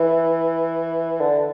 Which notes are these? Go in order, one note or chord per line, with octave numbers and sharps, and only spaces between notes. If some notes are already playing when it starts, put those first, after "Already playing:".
Already playing: E3
D3